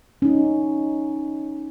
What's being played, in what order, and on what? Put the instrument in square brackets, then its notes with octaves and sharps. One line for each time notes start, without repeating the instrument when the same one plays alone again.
[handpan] C#4 D#4